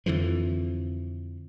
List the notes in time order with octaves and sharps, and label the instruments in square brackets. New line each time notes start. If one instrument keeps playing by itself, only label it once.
[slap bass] F2 D3 E3 F3